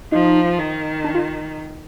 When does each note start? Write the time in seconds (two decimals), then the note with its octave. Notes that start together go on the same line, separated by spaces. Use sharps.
0.12 F3 D#4
0.58 D#3
1.04 D4
1.15 F4